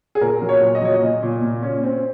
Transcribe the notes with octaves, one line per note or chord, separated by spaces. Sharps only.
G#4
A#2 A#4
F#3
C#5
A#2
D#5
F#3 C#5
D#5
A#2
A#2
A#2
C#4
C4